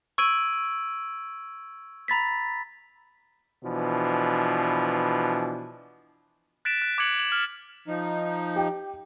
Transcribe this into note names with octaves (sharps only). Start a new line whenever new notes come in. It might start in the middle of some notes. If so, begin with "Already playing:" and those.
C#6 E6 G#6 D7 D#7 F#7
A#5 B5 A6 B6
B2 E3 F3 D4
F#6 A6 B6 D7 E7
F#6
D6 F#6 G#6 C#7 F#7
F#7
F6
F3 D#4
G4 G5